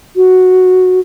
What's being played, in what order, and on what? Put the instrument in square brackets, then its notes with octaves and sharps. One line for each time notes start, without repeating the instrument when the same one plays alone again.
[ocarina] F#4